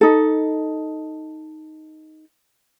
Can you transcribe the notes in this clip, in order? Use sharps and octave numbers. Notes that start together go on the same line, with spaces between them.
D#4 A4